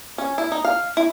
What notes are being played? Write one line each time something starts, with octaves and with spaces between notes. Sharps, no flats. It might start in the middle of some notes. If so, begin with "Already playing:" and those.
C#4
E4
D#4
F5
E4